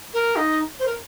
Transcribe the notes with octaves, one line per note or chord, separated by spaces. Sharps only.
A#4
D#4
C5
A#4